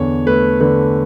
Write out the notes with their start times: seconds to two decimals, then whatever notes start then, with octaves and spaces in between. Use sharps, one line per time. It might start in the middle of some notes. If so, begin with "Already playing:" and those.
Already playing: E2 D3 C#5
0.27 A3 B4
0.60 D3 B4